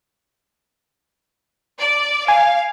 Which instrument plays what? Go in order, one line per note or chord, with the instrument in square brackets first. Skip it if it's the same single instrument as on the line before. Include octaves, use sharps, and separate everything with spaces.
[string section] D5
[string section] F5 [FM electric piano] G#5